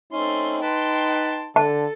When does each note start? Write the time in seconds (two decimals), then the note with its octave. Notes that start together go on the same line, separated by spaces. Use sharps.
0.13 A3 C4 C#4 D#4 C6
0.62 B4 G5 A5 C6
1.56 D3 A4 A5